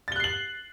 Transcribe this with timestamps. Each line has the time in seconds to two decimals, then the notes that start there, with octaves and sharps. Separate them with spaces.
0.08 A6
0.12 G7
0.16 F#6
0.20 C7
0.24 F#7